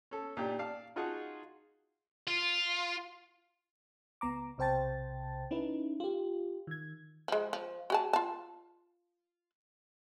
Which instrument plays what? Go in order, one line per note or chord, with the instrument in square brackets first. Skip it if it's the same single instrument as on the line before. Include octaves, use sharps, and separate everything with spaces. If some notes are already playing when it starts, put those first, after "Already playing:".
[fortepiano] C#4 A4
A#2 D4 D#4 G4
D5 F5 A5
D#4 F4 F#4 G#4 F#5 A5
[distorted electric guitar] F4
[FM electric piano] C#2 B3 A#5 D6
B1 C3 C5 G5 A5 A6
C#4 D#4 E4 B4
F4 G4
D#3 G#6
[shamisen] F3 G#3
F3
F#4 G#4 A5
F4 A5